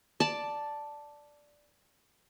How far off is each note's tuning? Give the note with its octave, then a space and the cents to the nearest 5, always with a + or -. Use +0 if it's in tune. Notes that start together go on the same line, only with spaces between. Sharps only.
D5 +0 A5 +0